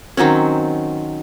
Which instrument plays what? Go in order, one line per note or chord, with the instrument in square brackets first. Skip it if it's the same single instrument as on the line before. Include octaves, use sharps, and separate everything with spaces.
[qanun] D#3 F#3 C4 C#4